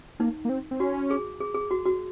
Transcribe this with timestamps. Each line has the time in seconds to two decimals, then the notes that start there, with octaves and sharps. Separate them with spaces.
0.20 A#3 D#4
0.45 A#3
0.49 C4
0.71 C4
0.80 C#4 F#4
1.10 G#4
1.40 G#4
1.54 G#4
1.71 F#4
1.85 F#4